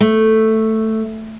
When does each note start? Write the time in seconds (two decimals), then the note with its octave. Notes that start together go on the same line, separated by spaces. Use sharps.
0.01 A3